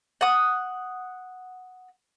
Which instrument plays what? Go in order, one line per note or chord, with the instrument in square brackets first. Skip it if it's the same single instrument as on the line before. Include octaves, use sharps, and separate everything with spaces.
[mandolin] F#5 D#6